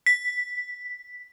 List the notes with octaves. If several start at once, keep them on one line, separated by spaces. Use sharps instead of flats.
B6